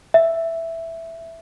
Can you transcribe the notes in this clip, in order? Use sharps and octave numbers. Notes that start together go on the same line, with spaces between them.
E5